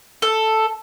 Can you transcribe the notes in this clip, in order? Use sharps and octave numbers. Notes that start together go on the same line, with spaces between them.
A4